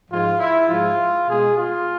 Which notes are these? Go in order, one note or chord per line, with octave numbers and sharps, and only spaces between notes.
G#2 F3 G#3 F4
E4
G#2 F3 G#3 F4
B2 G#3 G#4
F4